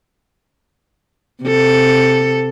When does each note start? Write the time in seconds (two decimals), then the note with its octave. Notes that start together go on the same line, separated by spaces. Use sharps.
1.43 C3 A4